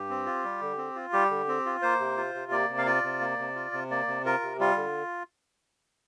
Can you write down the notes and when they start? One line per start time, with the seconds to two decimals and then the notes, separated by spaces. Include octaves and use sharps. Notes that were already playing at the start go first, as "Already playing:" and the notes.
Already playing: G2 G4
0.10 C4
0.26 F4
0.44 G3
0.61 D3
0.78 C4
0.96 F4
1.13 G3 G4
1.31 D3
1.48 C4
1.66 F4
1.82 A#3 C5
2.00 C3
2.17 F4
2.35 C3
2.52 A#3 D5
2.69 C3
2.78 F5
2.86 F4 D5
3.03 C3
3.21 A#3
3.39 C3
3.55 F4
3.73 C3
3.90 A#3 D5
4.08 C3
4.25 F4 A#4
4.43 C3
4.60 G3 F4
4.77 D3